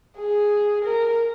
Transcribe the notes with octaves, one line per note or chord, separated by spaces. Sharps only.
G#4
A#4